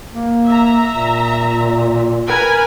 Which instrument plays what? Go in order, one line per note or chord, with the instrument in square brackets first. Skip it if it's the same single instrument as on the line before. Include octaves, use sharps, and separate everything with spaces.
[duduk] A#3
[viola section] E5 A#5
[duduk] A#2
[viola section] A#4 B4 G#5